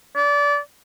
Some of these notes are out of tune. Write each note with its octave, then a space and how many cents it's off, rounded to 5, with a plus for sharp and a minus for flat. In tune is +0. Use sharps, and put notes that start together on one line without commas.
D5 -25